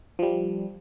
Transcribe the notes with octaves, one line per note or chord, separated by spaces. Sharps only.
F3 G3